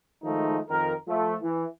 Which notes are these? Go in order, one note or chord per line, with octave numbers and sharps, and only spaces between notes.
D#3 F3 G#3 A3 D#4
F2 D#3 A#4
F3 A3
E3